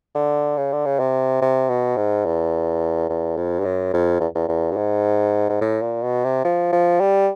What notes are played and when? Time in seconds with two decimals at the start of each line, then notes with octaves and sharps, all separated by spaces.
0.15 D3
0.57 C#3
0.72 D3
0.85 C#3
0.99 C3
1.41 C3
1.69 B2
1.97 G#2
2.25 E2
3.09 E2
3.37 F2
3.60 G2
3.65 F#2
3.93 F2
4.20 E2
4.35 E2
4.49 E2
4.71 G2
4.76 G#2
5.49 G#2
5.61 A2
5.82 A#2
6.03 B2
6.24 C3
6.44 F3
6.72 F3
7.00 G3